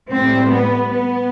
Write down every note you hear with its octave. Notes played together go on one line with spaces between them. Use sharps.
A2 G3 C4
B3
B3